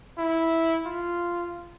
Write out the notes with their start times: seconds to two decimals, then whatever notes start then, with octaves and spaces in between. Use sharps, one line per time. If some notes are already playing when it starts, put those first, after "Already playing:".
0.18 E4
0.86 F4